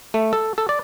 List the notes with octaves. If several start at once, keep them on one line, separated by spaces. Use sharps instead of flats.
A3
A4
A4
D5